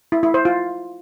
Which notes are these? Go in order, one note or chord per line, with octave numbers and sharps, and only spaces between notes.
E4
E4
C5
F4